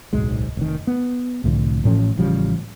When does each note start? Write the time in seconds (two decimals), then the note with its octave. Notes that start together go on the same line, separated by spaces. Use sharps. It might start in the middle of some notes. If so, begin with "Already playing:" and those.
0.13 D1 B1 G#2 G#3
0.57 F1 D#3
0.87 B3
1.44 C2 A2 D3 F3
1.84 A1 A2 F3 C#4
2.17 A1 C#3 F3 G3